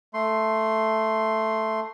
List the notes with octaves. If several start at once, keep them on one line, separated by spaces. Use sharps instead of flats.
A3 C6